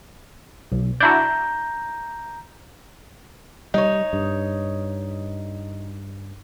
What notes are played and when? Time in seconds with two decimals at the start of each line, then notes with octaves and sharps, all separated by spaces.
0.72 B1
1.00 D4 E4 F#4 A#5 G6
3.74 G3 D#4 C#5
4.13 G2